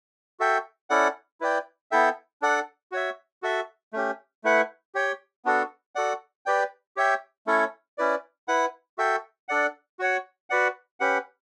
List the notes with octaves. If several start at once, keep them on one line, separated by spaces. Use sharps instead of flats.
F#4 A4 E5 G5
C#4 E4 A4 D5 F#5
E4 B4 D5 G5
B3 E4 A4 E5 G5
D4 A4 D5 F#5
F#4 C#5 E5
F#4 A4 E5
A3 C#4 G4
A3 E4 B4 F#5
G4 C#5 G5
B3 D4 F#4 A4
F#4 A4 D5 F#5
G4 B4 D5 G5
G4 C#5 E5 G5
A3 C#4 E4 A4 C#5
C#4 E4 B4 D5
E4 B4 F#5
F#4 A4 E5 G5
D4 A4 D5 F#5
F#4 C#5 F#5
F#4 B4 D5 F#5
C#4 G4 B4 F#5